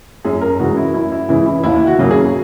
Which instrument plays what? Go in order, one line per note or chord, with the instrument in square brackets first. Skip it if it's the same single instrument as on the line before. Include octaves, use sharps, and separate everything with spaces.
[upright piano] F#2 G#4
A#4
C#3 E3 G#3 F#4
E4
F#2 E4
E4
C#3 E3 G#3 E4
E4
D#2 E4
F#4
C#3 F#3 A#3
G#4